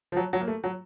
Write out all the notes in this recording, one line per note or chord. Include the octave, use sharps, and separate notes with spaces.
F3
F#3
F#3
A#3
A3
F#3